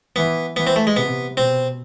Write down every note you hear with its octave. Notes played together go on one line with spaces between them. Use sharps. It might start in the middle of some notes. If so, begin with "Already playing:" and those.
E3 B3
E3 B3
C4
A3
G#3
C3 B3
B2 C4